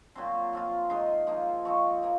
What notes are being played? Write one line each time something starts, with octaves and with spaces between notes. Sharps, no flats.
A#2 F#3 C4 C6
F3 C4 F4
D#3 G#3 D#4 C6
F3 A#3 D#4
F3 C4 D#4 C#6
F3 A#3